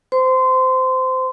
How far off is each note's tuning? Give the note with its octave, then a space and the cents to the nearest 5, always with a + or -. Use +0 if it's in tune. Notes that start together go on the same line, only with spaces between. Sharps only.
C5 -20 C6 -20